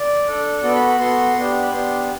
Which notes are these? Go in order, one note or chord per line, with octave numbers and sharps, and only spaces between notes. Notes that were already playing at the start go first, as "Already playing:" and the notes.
Already playing: D5
D4 A4
B3 F#4 A4 D5
B5
B5
B3 F#4 A4 C6
B3 D4 G4
B5
B3 D4 G4 C6